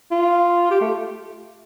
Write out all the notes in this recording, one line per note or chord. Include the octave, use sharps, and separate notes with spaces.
F4
G4
A3